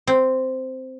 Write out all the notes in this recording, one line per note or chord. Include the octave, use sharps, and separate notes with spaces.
C4